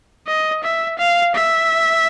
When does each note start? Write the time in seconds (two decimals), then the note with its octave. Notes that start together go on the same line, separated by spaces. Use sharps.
0.27 D#5
0.63 E5
0.98 F5
1.34 E5